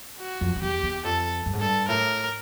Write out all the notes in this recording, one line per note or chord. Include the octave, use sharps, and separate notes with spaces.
F#4
F2
F2
E2 G4
E2
F2 A4
G2
G#2
G2 A4
A2 A#4